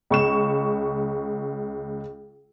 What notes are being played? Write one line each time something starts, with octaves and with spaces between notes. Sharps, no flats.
C#2 C#6 E7